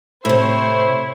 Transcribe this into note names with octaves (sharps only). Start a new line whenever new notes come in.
A2 C3 E4 C5 C#5